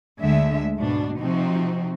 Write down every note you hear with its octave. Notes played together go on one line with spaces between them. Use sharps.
D2 D3 G#3 E5
G#2 B2 D4
C3 F3 C4 D#4 F#4